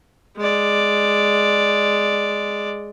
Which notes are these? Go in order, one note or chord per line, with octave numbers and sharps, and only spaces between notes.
G#3 D5